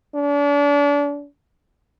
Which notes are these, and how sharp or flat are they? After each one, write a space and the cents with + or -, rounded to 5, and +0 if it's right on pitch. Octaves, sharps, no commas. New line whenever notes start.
D4 -35